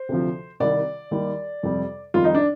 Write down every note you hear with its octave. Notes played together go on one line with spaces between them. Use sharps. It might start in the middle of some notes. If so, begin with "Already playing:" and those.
Already playing: C5
D2 C3 F3
C2 C3 D#3 G3 D5
D#2 D#3 G3
F2 C3 G3
F2 D#3 G3 F4
D#4
D4